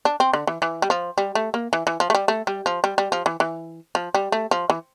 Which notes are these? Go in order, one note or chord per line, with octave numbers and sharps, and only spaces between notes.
D4
C4
D3
E3
E3
G3
F3
G3
A3
A#3
E3
E3
F3
A3
G3
A3
G3
F3
G3
G3
F3
E3
E3
F3
G3
A3
F3
E3